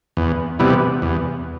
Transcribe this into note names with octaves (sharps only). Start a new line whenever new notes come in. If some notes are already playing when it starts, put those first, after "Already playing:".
E2
C3 E3 G3 B3
E2